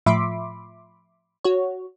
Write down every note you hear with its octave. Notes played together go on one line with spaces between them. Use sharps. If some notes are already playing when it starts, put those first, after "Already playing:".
A2 F3 E5 B5 C6 D6
F#4 C#5